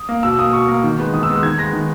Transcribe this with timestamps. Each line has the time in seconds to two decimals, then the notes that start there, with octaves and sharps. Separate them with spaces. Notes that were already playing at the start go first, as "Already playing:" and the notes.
Already playing: D#6
0.09 A#3
0.23 B2 E6
0.38 A#3 D#6
0.53 B2 C#6
0.68 A#3
0.83 D#3
0.99 G#3 B3
1.13 D#3 D#6
1.23 E6
1.29 G#3 B3
1.43 D#3 G#6
1.58 G#3 B3 A#6
1.73 D#3